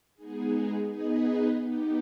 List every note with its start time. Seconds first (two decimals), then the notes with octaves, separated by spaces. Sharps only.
0.15 G#3 B3 D#4 G#4
0.86 B3 D#4 G#4 B4 D#5
1.59 B3 D#4 G4